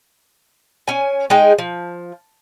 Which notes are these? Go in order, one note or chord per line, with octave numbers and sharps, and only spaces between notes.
C#4 G#5
G#3 D#4 G#4 G5
F3